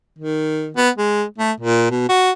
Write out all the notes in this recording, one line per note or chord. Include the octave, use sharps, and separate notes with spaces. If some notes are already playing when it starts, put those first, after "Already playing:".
D#3
B3
G#3
A3
A#2
B2
F#4